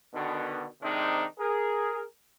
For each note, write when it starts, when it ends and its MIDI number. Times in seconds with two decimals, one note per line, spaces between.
0.14 0.66 47
0.14 0.66 50
0.14 0.66 51
0.82 1.24 48
0.82 1.24 51
0.82 1.24 56
0.82 1.24 60
0.82 1.24 62
0.82 1.24 63
1.39 2.03 68
1.39 2.03 70